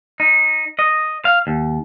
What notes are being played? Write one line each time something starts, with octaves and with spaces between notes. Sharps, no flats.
D#4
D#5
F5
D#2